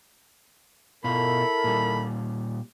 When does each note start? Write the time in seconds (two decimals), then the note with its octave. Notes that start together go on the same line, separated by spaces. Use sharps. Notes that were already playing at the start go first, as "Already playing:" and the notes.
1.04 B2 E4 F4 A4 A#4 B5
1.64 A#2 G3